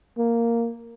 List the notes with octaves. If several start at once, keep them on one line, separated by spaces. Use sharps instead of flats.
A#3